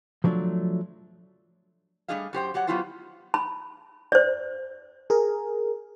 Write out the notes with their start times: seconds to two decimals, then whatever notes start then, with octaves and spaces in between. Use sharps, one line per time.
0.24 F3 F#3 A3 D4
2.08 G3 A3 D4 G#4 D#5 F5
2.33 F#2 G4 C5 G5
2.54 F#3 G4 C#5 F#5
2.67 F#3 B3 E4 F4 G4 C5
3.34 B5
4.12 C5 D5
5.10 G#4 A#4